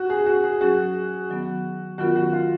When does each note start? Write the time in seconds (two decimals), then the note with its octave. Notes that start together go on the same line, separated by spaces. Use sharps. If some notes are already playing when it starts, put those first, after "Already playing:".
Already playing: F#4
0.10 G#4
0.26 F#4
0.44 G#4
0.61 F#3 C#4 F#4 G#4
1.30 D#3 F#3 B3
1.98 D#3 F#3 B3 F4 F#4 A#4
2.16 F#4
2.33 F4